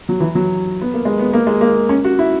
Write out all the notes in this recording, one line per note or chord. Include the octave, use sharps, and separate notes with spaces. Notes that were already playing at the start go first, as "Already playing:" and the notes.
F#3
E3
F#3
B3
A#3
G#3
B3
A#3
G#3
A#3
C#4
F#4
E4